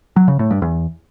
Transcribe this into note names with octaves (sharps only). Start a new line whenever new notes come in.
F#3
C#3
A2
G2
E2